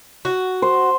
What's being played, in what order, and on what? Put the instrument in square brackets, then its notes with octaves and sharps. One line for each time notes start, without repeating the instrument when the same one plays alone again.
[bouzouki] F#4
[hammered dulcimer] C5